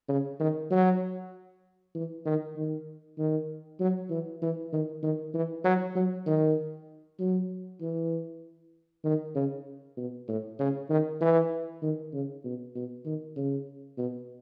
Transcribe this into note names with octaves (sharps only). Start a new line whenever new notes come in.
C#3
D#3
F#3
E3
D#3
D#3
D#3
F#3
E3
E3
D#3
D#3
E3
F#3
F#3
D#3
F#3
E3
D#3
C#3
B2
A2
C#3
D#3
E3
D#3
C#3
B2
B2
D#3
C#3
B2